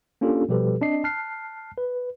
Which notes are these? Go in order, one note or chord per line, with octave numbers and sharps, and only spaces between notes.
A#3 C#4 D4 F4 G4 A4
B2 F3 G3 G4 A4 B4
C4 D4 D#5 C7
A5 F6 F#6 C7
B4